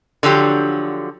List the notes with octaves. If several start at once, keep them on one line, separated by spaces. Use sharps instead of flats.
D3 F3 F#3 G4